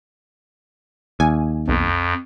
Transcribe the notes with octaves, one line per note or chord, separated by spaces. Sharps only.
D#2 G#5
B1 F2